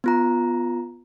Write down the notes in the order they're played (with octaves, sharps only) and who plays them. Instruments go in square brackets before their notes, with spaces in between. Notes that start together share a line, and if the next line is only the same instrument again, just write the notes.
[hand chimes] B3 F4 A#5